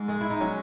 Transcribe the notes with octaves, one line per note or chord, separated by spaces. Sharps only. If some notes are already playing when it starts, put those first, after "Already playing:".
Already playing: G#2
G#3
E4
D#4
F#3 C#4